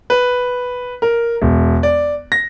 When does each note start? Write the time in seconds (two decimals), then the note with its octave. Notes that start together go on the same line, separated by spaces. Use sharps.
0.10 B4
1.02 A#4
1.42 E1
1.83 D5
2.32 A#6